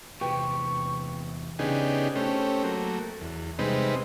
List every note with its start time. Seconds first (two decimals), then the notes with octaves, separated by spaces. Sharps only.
0.21 E2 C3 G4 B4 C#6
1.59 C#3 B3 D4 D#4 G4 G#4
2.15 A3 C4 C#4 G4
2.64 F#3 A3 A#3
3.21 E2
3.59 C3 G3 G#3 C4 D#4 B4